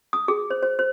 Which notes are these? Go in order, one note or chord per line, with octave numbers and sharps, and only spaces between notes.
D#6
G#4
C5
C5
C5